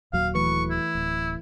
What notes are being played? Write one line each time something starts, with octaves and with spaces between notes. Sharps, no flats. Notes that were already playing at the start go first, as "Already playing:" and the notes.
D#1 D#2 F#3 F5
E3 A3 B4 C#6
E4
D1